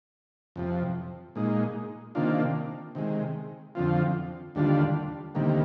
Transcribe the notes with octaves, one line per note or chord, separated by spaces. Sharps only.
F2 C3 F3
A#2 G#3 D#4
C3 D#3 A#3 D4 F4
C3 D#3 G#3
F2 D3 F3 C4 F4
D#2 D3 G3 D4 F4
D2 C3 D#3 G3 A#3